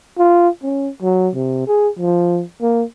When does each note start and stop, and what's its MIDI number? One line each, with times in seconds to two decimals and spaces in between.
0.18 0.49 65
0.63 0.89 61
1.02 1.29 54
1.35 1.65 48
1.67 1.89 68
1.99 2.43 53
2.62 2.83 58